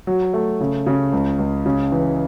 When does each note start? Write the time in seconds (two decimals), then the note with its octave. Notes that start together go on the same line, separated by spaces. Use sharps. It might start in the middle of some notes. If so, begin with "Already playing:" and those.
0.07 F#3
0.34 A3
0.61 C#3
0.86 C#3
1.13 C#2
1.39 C#2
1.66 C#3
1.92 E3